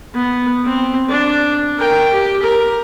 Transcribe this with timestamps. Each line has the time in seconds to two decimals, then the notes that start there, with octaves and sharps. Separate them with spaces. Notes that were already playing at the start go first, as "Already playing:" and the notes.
0.14 B3
0.64 C4
1.09 D4
1.78 A#4 G5
2.13 G4
2.42 A#4